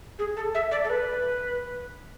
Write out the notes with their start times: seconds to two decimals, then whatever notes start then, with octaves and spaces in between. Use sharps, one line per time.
0.19 G#4
0.37 A4
0.55 E5
0.71 D5
0.84 A4
0.90 B4